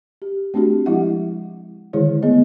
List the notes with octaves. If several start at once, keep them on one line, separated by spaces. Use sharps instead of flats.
G4
A3 C4 D4 F#4 G4
F3 G#3 E4 G4 E5 F#5
D3 D#3 G#3 E4 G#4 C#5
A3 B3 G#4 D#5